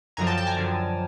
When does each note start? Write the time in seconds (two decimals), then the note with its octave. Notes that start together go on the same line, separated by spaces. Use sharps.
0.17 F#2 D3 F3 G#5 A#5
0.27 G5 A5
0.37 G5 A5
0.47 G#5 A#5
0.57 F#2 D3 F3